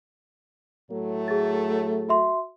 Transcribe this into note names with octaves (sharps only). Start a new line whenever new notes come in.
A2 F#3 A3
G#4 A6
F#4 E5 C6